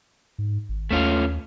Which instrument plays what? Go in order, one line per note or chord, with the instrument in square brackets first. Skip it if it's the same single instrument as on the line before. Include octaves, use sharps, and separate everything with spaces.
[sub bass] G#2
G#1
[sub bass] D#2 [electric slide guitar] A3 C#4 F4